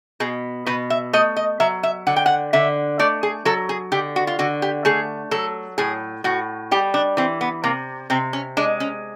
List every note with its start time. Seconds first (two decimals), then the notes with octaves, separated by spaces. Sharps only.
0.20 B2 G#4
0.66 B2 B4
0.90 E5
1.13 A3 D#5
1.36 D#5
1.60 F#3 E5
1.83 E5
2.07 D3 F#5
2.16 G5
2.26 F#5
2.53 D3 E5
2.99 A3 D5
3.23 G#4
3.45 F#3 A4
3.69 G#4
3.92 D3 G4
4.16 F#4
4.27 F4
4.39 D3 F#4
4.62 G4
4.85 A3 G#4
5.31 F#3 A4
5.78 A2 G#4
6.24 A2 F#4
6.71 G3 G4
6.94 D4
7.17 E3 C4
7.41 B3
7.64 C3 A#3
8.10 C3 C4
8.33 C#4
8.57 G#3 D4
8.80 C#4